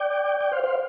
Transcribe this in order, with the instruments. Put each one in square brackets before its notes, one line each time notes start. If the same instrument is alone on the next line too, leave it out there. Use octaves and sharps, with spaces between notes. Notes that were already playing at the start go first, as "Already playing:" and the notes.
Already playing: [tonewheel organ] D5 G5
D5 G5
C5 F5
C5 F5